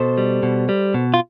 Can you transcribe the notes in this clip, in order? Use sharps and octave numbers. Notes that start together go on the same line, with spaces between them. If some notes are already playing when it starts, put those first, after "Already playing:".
Already playing: B2 A4 C5
G3
B2
G3
B2
F4